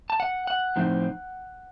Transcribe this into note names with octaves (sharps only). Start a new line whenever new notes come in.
A5
F#5
F#5
A2 F3 C4 D#4